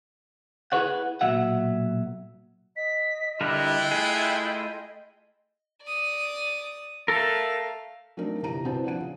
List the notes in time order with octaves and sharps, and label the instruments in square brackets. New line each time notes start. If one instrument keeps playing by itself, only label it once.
[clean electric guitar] B3 E4 G#4 B4 C#5 F#5
B1 A#2 F#3 E5 F#5
[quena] D#5 [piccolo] B6
[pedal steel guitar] D3 G3 A#4 [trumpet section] E4 F4 G5 [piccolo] F#6
[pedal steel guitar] A3 G#4
[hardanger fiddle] D5 D#6
[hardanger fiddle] A3 F5 [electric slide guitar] A4 A#4
[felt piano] F#3 A3 C4 D4 D#4 A#4
G1 C3 E3 A#5 D#7
C2 B3 C4 F#4 C5 A5
F3 D4 F#5 D#7
C#3